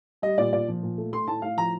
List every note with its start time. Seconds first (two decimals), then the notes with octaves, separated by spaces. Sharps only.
0.22 G3 D#5
0.38 A#2 D5
0.53 A#2 D5
0.68 F3
0.83 A#2
0.98 A3
1.13 A3 C6
1.27 A2 A5
1.42 A2 F5
1.57 F3 A#5